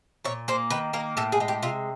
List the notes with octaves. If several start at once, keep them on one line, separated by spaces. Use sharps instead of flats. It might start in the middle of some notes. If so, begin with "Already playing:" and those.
A#2 C#5
A#3 C5
D#3 B4
A#3 A#4
A2 A4
G#4
G#3
G4
C3 F4